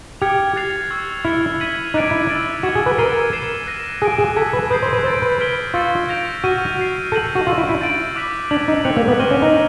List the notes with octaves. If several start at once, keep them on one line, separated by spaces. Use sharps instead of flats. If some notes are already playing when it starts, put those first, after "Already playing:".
G4 F6 G#6 C#7 F7
F#6 A6 C7 F7
C#6 E6 G#6
E4 F6 G#6 C#7 F7
G#6 B6 D#7 F#7
D#4 D6 F#6 A6 D7 F#7
E4
E6 A6 D7
F#4 F6 G#6 C#7 E7
G#4
B4
A#4 E6 A6 C7 D#7 G7
G#6 C7 E7
F#6 A#6 D#7
G#4 F#6 A#6 D7
G#4
A4 E6 G#6 B6
B4
B4 D#6 G6 C7
C5
B4
C5 E6 A6 D7
B4
F6 G#6 B6 D7 G7
F4 C#6 E6 A6 C#7
G6 A#6 D7 F7
F#4 F6 A#6 D#7
F#6 A6 C7
A4 G6 A#6 D#7 F#7
F#4
F4 C#6 E6 G6
E4
E4
A6 D7 F#7
D6 F#6 B6
D4 G#6 B6 D7 F#7
D#4
C4 F#6 A6 C#7 F7
A#3
B3
C4 C#6 F6 A#6 D#7 G7
C#4
D#4